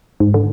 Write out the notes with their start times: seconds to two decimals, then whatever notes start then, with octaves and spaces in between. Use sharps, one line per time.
0.20 G#2
0.34 D3